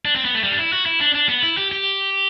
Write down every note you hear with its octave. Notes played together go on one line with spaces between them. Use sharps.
D4
C4
B3
A3
G3
D4
E4
F#4
E4
D4
D4
B3
E4
G4
G4